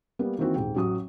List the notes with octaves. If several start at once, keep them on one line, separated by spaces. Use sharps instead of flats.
G3 A#3 B3
D#3 E3 A#3 C4 F#4
D#1 G#2 G5
A1 F#3 F#4 D#6